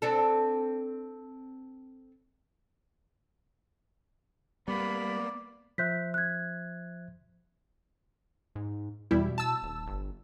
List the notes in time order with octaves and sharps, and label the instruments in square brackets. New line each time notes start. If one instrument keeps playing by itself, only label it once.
[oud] C4 D4 A4
[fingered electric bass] G3 [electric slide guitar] A#3 B3 [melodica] D5 [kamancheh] B5
[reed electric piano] F3 C5 E5 [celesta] F#6 G6 B6
[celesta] F#6 G#6
[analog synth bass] G#2
[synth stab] E2 G3 E4 [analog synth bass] B2
[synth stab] A5 E6
[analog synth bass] D#1
G1